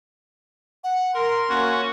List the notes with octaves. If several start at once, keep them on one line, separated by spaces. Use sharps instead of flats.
F#5
A#4 C6
A#3 C#4 F#4